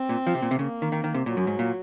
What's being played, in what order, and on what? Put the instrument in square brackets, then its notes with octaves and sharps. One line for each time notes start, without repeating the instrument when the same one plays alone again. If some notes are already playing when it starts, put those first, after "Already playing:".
Already playing: [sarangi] C4
[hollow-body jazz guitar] A#2
F3
C3
A#2
C3
[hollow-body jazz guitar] C#3 [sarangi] A#3
[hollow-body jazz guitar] D#3
D#3
D#3
C3
[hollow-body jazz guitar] A#2 [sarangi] F#3
[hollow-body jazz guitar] F#2
G#2
A#2